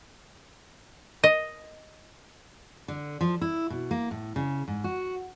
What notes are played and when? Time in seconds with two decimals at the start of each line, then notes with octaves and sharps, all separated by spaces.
1.24 D#5
2.88 D3
3.21 F3
3.41 E4
3.70 B2
3.91 A#3
4.11 A2
4.36 C#3
4.68 G#2
4.84 F#4